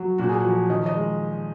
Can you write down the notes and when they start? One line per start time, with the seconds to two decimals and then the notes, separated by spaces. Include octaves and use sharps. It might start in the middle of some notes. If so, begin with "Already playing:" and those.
Already playing: F#3
0.18 A#2 F#4
0.29 G#4
0.40 F3 F#4
0.69 D#3 D#5
0.86 D#5
0.96 G#3